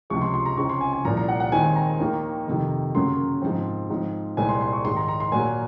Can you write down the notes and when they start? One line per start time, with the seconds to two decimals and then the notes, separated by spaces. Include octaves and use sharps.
0.10 C#2 C3 F3 G#3 C#6
0.21 C6
0.34 C6
0.45 A#5
0.57 C#2 C#3 G#3 C4 C#6
0.69 C6
0.81 G#5
0.93 G#5
1.05 C2 A#2 F3 A#5
1.17 A#5
1.28 F#5
1.40 F#5
1.52 D#2 D#3 G#3 C4 G#5
1.76 A#5
2.00 D#2 D#3 A#3
2.47 F2 C3 D#3
2.95 F#2 C#3 F#3 A#3 C6
3.42 G#2 F3 C4
3.90 G#2 F3 C4
4.37 C2 A#2 G#3 C4 G#5
4.49 C6
4.61 C6
4.73 C#6
4.84 G#2 D#3 G#3 C6
4.96 A#5
5.08 A#5
5.20 C6
5.32 A#2 F#3 A#3 G#5